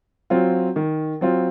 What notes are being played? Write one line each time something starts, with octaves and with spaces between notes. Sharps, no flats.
F#3 C4 F4
D#3
F#3 C4 F4